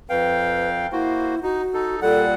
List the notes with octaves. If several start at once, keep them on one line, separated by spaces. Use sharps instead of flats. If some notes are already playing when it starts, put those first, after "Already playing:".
F2 B4 F5 G5
A#3 E4 F#4 C5
D#4 F#4
D#4 A4
A#2 G3 A4 F#5